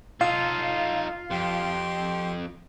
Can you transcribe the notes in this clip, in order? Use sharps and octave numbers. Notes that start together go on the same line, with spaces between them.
D#4 F4 A4 F5
F2 G4 C6